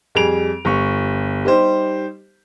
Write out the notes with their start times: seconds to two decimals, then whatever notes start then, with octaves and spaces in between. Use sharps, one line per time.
0.15 F2 G3 G#4 D7 F7
0.65 G1 C#6
1.45 G3 D#4 G4 C5